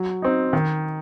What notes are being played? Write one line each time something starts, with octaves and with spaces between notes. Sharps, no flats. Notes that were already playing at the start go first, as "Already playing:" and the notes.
Already playing: F#3
C4 D#4
D#3